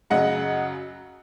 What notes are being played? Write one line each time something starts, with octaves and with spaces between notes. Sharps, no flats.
F#2 C#3 F#3 D#5 F#5